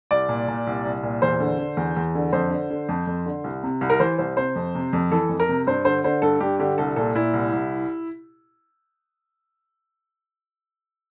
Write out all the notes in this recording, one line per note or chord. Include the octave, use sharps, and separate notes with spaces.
C2 D5
A#2
A#2
C2
C2
A#2
E2 C5
D3
D3
E2
E2
D3
F2 C5
D3
D3
F2
F2
D3
C2
C3
C2
A#4
E3 C5
C2 C5
C3 C5
F2
C3
F2
E3 A4
F2
A#4
C3
G2 C5
D3 C5
D3 C5
G2 A4
G2 G4
D3 G4
C2 A4
A#2 A4
A#2 E4
C2
C2